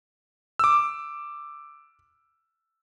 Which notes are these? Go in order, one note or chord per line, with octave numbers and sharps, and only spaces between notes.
D6 E6